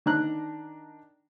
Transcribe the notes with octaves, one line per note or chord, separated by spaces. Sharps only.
D#3 D4 A#5 F#6